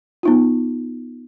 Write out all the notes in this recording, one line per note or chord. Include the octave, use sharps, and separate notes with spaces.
B3 D#4 F4